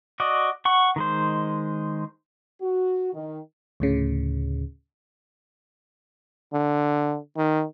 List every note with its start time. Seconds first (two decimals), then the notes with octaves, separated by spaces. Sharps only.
0.20 F#4 D5 D#5
0.65 F#5 C#6
0.96 D#3 G#3 C5
2.61 F#4
3.13 D#3
3.80 D2 A2 C#3
6.53 D3
7.37 D#3